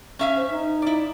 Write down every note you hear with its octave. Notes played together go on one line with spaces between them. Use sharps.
C#4 E5 F5
C5
D#4
E4 D5